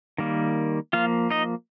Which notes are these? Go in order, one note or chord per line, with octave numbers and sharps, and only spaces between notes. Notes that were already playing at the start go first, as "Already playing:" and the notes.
D#3 G3 A#3
F3 A#3 F4 F5
D#4 D#5